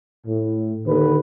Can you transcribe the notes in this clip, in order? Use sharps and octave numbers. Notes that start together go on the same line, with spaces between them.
A2
D#2 D3 B4